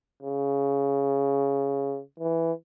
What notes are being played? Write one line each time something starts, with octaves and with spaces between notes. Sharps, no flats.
C#3
E3